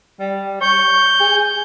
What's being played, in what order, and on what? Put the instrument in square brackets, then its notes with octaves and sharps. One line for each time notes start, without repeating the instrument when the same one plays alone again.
[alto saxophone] G3
[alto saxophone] C#5 [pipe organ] G6
[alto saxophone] G#4